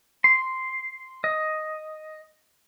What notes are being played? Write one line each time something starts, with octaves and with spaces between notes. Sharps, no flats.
C6
D#5